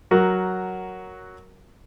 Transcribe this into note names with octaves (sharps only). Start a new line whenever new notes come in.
F#3 F#4 A#4